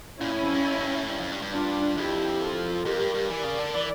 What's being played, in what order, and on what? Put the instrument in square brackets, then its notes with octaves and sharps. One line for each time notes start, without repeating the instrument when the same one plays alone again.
[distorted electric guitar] A#2 [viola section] C#4 E4
[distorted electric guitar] A2
F2
G2
F2
G2
A2
G2
F2
G2
G2
[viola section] D4 F4
[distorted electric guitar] F2 [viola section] E4 G4
[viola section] F4 A4
[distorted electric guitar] F2 [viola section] G4 A#4
[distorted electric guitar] G2
G2
[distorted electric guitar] E3 [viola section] A#4 D5
[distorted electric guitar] C#3
D3
E3